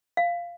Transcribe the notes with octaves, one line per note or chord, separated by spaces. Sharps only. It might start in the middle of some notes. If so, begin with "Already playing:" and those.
F5